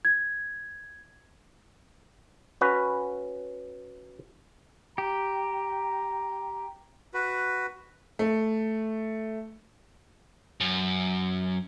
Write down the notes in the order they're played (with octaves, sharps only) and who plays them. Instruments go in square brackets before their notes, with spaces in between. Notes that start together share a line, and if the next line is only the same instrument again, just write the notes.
[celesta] G#6
[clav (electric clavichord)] C#4 F#4 B4
[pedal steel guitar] G4 [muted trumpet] A#5
[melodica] F#4 B4
[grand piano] A3
[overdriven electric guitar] F#2